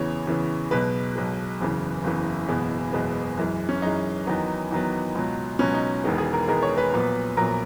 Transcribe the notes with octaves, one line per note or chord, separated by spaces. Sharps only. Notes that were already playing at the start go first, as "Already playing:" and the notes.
Already playing: E2 C#3 E3 B3 C#5
E2 C#3 E3 B3
B1 B2 G#3 B4
B1 B2 G#3
F#1 E2 C#3 E3
F#1 E2 C#3 E3
F#1 E2 B2 G#3 B3
F#1 E2 B2 G#3 B3
F#2 E3 G#3
C#4
F#2 E3 G#3 D#4
E2 D#3 F#3 B3
E2 D#3 F#3 B3
C#2 B2 F#3
C#2 B2 F#3 C#4
D#4
E1 E2 D#3 G#3 B3
G#4
A#4
E1 E2 D#3 G#3 B3 A#4
C#5
B4
A#1 A#2 F#3 B3
A#1 A#2 F#3 B3 A#4